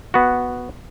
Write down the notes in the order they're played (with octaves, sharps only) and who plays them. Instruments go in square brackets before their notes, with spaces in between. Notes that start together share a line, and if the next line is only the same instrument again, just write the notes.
[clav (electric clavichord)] B3 F#4